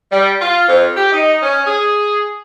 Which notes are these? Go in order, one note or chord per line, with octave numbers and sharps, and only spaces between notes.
G3
F4
F2
G4
D#4
C#4
G#4